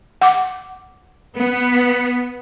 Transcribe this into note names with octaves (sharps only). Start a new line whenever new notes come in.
F#5 D6
B3